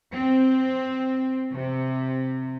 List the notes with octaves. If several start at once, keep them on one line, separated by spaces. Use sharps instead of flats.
C4
C3